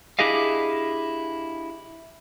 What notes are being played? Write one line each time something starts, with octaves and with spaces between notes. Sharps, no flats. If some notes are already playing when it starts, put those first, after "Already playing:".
D4 E4 G4 G#4 D#5 F5